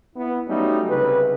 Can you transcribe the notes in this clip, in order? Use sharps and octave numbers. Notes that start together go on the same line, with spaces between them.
B3 E4
F#3 G3 A3 C#4 D#4
C2 C#3 B4